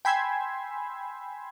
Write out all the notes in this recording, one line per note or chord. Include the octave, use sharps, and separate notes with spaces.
G5 G#5 B5 C6 E6 G#6